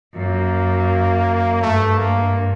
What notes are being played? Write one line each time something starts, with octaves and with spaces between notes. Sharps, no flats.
F#2 A#3
G2 A3
A#3